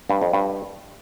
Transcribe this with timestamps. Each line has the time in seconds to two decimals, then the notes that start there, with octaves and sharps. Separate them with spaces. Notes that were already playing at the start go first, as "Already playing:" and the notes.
0.10 G2
0.21 F2
0.33 G2